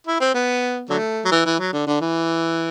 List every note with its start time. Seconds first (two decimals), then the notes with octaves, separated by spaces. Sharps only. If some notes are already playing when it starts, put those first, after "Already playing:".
0.07 E4
0.20 C4
0.34 B3
0.89 D3 F#3 A3
1.25 F#3
1.31 E3
1.46 E3
1.59 F#3
1.73 D3
1.87 D3
2.01 E3